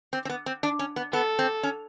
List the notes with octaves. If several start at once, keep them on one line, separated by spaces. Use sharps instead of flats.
C4
C4
B3
C4
D4
C#4
B3
B3 A4
C4
C#4